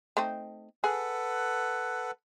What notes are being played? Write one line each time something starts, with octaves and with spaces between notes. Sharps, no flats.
A3 C4 D#4
G#4 A4 B4 F#5